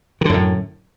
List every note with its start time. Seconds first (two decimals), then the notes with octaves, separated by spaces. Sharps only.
0.21 D#3
0.25 D3
0.29 F#2
0.34 A2